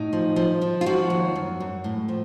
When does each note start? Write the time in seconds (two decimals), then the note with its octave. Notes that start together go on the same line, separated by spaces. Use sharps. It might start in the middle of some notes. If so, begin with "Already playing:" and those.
Already playing: A2 D#4
0.13 F3
0.36 F3
0.61 F3
0.81 F4
0.86 F3 F#4
1.10 D#2
1.35 F#2
1.60 F#2
1.84 A2
2.08 F3